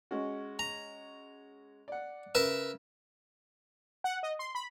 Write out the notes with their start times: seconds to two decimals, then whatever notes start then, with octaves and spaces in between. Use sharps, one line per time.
0.11 G#3 C#4 F#4
0.59 A#5
1.88 D5 F#5
2.35 C#3 A#4 B4 E5
4.04 F#5
4.23 D#5
4.39 C6
4.55 B5